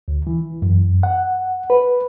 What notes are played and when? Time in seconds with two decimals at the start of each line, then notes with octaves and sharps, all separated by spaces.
0.08 D2
0.27 E3
0.62 F#2
1.03 F#5
1.70 B4